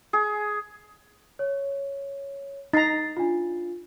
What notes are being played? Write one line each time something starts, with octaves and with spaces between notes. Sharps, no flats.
G#4
C#5
D#4 A#5 A6 C7
D4 F4